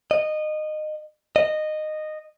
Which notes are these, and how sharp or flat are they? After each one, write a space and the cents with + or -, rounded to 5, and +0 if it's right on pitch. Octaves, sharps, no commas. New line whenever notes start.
D#5 -20
D#5 -15